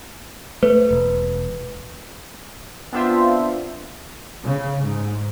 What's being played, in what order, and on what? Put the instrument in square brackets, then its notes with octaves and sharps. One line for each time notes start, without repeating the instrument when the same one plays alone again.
[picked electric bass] A3 [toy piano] B4
[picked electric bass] E1
[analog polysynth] B3 C4 D4 F4 C5 E5
[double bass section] C#3
G#2